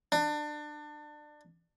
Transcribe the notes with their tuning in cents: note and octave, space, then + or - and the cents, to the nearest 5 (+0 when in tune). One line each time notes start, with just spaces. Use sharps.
D4 +25